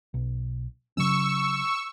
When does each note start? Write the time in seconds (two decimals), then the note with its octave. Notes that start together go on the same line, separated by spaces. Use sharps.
0.14 B1
0.97 C#3 F#3 C#4 C#6 E6